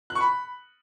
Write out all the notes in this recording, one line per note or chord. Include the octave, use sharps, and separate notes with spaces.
F#6
C#6
B5